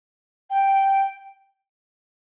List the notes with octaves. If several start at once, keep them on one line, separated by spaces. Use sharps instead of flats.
G5